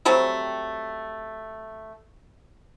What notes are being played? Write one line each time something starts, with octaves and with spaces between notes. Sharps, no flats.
F#3 G3 A3 C4